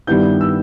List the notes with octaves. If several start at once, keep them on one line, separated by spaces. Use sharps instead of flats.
G2 D#3 G3 B3 E4 G6
E6